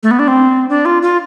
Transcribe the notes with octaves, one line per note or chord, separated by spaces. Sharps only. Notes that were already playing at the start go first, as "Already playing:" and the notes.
A3
B3
D4
C4
D4
F4
F4